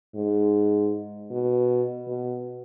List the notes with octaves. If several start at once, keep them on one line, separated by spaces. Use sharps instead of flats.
G#2
B2
B2